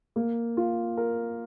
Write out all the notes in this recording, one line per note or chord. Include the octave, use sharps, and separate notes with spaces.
A#3
F4
A#4